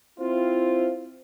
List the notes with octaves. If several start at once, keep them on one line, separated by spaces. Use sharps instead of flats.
C4 E4 F4